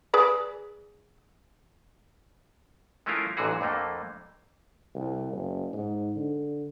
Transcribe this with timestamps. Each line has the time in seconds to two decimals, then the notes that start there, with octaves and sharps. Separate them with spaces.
0.14 G#4 B4 D5
3.06 G#3 A3 C#4 E4 F4 A#4
3.37 A1 A#2 D3 E3 F#4 G#4
3.61 F2 D3 A3 A#3
4.95 C2
5.33 F#1
5.73 G#2
6.16 D3